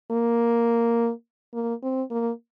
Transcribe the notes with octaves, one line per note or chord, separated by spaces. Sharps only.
A#3
A#3
C4
A#3